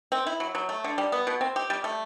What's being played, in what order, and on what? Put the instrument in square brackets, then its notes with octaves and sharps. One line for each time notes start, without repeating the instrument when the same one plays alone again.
[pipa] C4
E4
F#3
F#3
A3
D3
G3
B3
B2
C4
G4
G3
A3